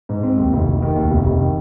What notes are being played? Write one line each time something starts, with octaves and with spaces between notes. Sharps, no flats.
G#2
C4
D#2
F1
F1
D#3
D#2
F1
F1
D#3